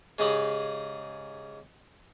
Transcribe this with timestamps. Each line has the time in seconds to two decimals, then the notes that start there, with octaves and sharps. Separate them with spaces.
0.19 G#2 C#3 D#4 G4 G#4 B5